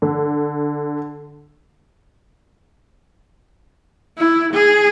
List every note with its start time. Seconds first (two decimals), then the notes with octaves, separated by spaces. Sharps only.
0.02 D3
4.18 E4
4.54 G#4